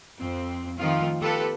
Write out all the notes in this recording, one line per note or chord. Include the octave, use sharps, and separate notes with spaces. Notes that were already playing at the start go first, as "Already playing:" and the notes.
F2 C4
D#3 F3 A3 C4 F4
B3 F4 G4 A4 B4